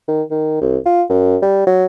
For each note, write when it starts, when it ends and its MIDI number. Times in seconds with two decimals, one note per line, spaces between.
0.08 0.23 51
0.31 0.60 51
0.61 0.77 36
0.86 1.03 65
1.10 1.37 42
1.42 1.64 55
1.67 1.86 54